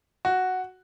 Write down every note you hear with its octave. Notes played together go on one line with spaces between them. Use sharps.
F#4